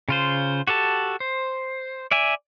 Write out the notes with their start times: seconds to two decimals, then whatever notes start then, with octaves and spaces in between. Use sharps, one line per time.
0.09 C#3 F4 C5
0.67 F#4 G4 A4 A5
1.20 C5
2.11 D5 E5 G#5